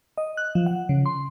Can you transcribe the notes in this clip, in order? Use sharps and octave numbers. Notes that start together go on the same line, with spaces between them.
D#5
F#6
F3
F#5
C#3
C6